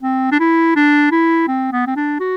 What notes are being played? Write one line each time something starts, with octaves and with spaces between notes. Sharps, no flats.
C4
D4
E4
D4
E4
C4
B3
C4
D4
F#4